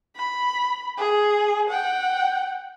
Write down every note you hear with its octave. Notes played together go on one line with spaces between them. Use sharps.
B5
G#4
F#5 G5